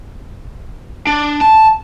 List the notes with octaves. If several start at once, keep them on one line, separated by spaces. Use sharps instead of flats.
D4
A5